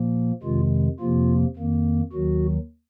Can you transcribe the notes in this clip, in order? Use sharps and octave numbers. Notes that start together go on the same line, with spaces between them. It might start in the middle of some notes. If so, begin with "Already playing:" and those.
Already playing: A#2 F3 A#3
F2 C3 D#3 G#3 F4
F2 C3 F3 A#3 F4
F2 D#3 A#3
D#2 D#3 F#3 F#4